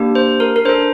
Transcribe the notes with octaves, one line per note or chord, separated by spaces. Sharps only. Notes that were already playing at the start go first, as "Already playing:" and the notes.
Already playing: A#3 D4 G4
C5
A#4
A#4
D4 A4 C5